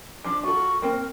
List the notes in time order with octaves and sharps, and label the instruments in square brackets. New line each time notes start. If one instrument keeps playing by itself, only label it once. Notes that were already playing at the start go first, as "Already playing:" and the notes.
[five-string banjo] F3 D4 [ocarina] D6
[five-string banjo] F4 A4 [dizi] F#4 [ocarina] C#6
[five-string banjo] A#3 C4 [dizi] A#4 [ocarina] G5